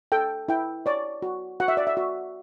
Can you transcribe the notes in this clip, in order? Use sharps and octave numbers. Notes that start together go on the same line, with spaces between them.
A4 G5
E4 G5
C#5 D5
F#4
F#4 F#5
E5
D5
E5
F#4